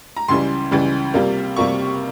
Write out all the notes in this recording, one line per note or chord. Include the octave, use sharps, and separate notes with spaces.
A#5
C#2 C#3 E3 G3 C6
C#2 C#3 E3 G3
C3 G3 A#3 F4
C3 G3 A#3 F4 C#6